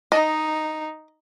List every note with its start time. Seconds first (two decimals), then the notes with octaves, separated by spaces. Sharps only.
0.12 D#4 D#5